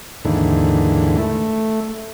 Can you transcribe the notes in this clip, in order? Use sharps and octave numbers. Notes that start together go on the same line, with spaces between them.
D#2 G#2 D3 E3
A3